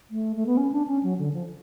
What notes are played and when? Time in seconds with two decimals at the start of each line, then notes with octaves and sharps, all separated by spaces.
0.11 A3
0.36 A3
0.46 B3
0.57 C#4
0.72 D4
0.87 C#4
1.03 F#3
1.19 D3
1.34 F3